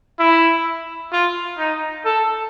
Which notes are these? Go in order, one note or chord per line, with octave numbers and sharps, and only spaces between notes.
E4
F4
D#4
A4